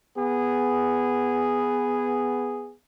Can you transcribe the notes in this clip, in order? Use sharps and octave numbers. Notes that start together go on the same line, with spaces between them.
B3 G#4